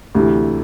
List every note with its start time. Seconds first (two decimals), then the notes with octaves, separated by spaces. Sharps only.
0.15 D2 C3 E3